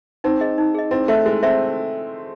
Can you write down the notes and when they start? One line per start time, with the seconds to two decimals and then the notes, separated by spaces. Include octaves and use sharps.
0.24 C4 D#4
0.40 G#4 D#5
0.58 D#4
0.74 G#4 D#5
0.91 C4 E4
1.08 A3 C5 E5
1.26 G#3 E4
1.43 C4 C5 E5